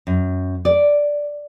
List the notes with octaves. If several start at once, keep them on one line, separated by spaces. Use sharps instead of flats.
F#2
D5